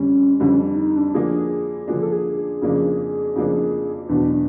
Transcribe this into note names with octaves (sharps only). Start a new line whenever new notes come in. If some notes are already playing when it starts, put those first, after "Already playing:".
Already playing: F2 D3 G3 C#4
F2 D3 G3 C#4
D4
D#4
D4
D3 F3 A#3 D4 G#4
D3 F3 A#3 D4 G#4
A4
G#4
G#4
F2 C#3 F3 A#3 D4
F2 C#3 F3 A#3 D4
E2 B2 F#3 D4
D4